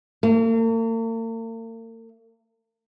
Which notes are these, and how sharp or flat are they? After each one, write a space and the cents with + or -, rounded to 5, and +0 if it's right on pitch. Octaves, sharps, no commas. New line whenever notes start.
A#3 -45